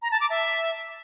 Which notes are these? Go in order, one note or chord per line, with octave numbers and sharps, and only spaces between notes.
A#5
A5
D6
E5